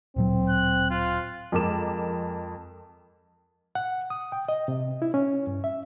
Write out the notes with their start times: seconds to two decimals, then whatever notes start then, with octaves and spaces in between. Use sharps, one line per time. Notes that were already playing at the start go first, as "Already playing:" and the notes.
0.16 D1 A#2 F#3 C4
0.49 F#6
0.90 F4
1.52 F2 G#3 A#4 D6 E7
3.75 F#5
4.10 D#6
4.32 G5
4.49 D#5
4.68 C3
5.02 E4
5.14 C#4
5.47 G2
5.64 E5